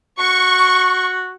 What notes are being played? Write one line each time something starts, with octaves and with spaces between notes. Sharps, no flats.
F#4 C#6